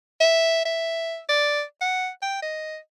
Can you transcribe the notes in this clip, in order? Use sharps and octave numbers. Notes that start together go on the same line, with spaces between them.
E5
E5
D5
F#5
G5
D#5